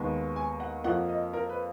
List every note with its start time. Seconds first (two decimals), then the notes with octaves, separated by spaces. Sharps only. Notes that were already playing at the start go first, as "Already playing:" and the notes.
Already playing: D#2 D#3 G#3 B3
0.36 G#5
0.60 F#5
0.84 F2 F3 A#3 F#5
1.09 D#5
1.33 A#4
1.49 B4